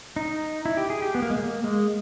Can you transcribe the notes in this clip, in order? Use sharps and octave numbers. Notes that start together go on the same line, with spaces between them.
D#4
E4
G4
G#4
G4
B3
A#3
G#3
A#3
G#3